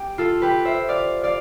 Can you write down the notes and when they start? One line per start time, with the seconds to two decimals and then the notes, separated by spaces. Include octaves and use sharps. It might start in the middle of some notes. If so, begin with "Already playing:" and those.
Already playing: G4
0.18 F4 A4
0.42 G4 B4
0.65 C5 E5
0.89 D5 F5
1.24 D5 F5